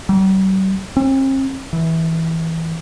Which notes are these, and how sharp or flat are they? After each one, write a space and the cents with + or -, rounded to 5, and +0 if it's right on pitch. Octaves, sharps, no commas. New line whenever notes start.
G3 -45
C4 +45
E3 -15